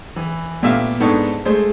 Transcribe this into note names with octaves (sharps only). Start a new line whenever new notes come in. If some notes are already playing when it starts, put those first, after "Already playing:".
E3
A#2 A3 B3 G4 E5 F5
G#2 B3 D4 D#4 A4 C#6
G#3 A3 C5